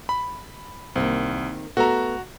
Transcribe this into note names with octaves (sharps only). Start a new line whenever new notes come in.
B5
C2 D#3 A#3 C4
A3 B3 F#4 A4 A#5